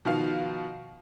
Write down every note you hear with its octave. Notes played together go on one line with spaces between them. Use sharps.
B2 D#3 F3 F4 F5